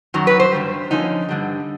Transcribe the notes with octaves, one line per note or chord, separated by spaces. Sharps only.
F#2 D#3 F#3
B4
C5
G2 D3 G3
D3 F3 A#3 C#4 D#4
G2 D3 G3